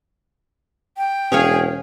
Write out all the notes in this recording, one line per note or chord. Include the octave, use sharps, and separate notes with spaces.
G5
E1 C#4 G#4 C#5 F5